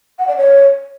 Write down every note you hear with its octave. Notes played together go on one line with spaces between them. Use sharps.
F#5
D5
C#5